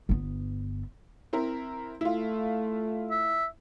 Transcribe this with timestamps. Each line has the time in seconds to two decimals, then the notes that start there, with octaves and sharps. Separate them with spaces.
0.09 G1 B3
1.33 C4 E4 A#4
2.01 A3 E4 F4
3.11 E5